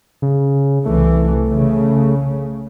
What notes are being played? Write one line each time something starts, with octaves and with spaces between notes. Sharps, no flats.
C#3
C2 E3 A3
C#3